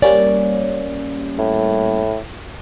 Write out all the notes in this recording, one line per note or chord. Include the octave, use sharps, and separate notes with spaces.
G3 A#3 C#4 D5
A2